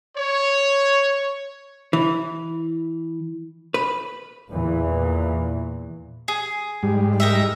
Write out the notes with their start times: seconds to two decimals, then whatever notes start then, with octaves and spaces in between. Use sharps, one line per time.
0.17 C#5
1.93 E3
3.74 B4
4.50 E2 A#2 E3
6.28 G#4
6.83 G#2 G3
7.20 D#4 A#4 E5